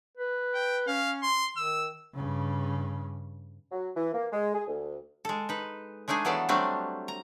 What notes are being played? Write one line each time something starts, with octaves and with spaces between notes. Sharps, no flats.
B4
G5
C#4 F5
C6
D#3 E6
G2 C#3
F#3
E3
A#3
G#3
G#4
D2
G#3 A4
D#4 B4
G#3 A3 D4 D#4 G#4
E3 F#3 B3 A4 D5 F5
F#3 G3 A3 C4 D4
A#5